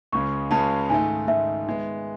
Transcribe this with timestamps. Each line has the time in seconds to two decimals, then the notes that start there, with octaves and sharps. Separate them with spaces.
0.12 C#2 C#3 G#3 C#4 C#6
0.51 C#2 C#3 G#3 C#4 A5
0.89 G#2 D#3 A3 G#5
1.28 G#2 D#3 A3 E5
1.67 D#3 G#3 B3